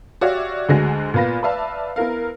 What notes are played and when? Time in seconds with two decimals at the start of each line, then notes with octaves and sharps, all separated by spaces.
0.21 F#4 G4 C#5 D5 E5 F5
0.69 D2 D3 G#3 F#4 G#5 A#6
1.14 A#2 B3 F4 B4 A#6
1.43 B4 D5 E5 F5 A5
1.96 B3 E4 A#4 F5